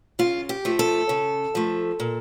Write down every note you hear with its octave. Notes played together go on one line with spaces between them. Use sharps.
C#3 F4
G4
F3 A3
A4
C#3
F3 A3
A#2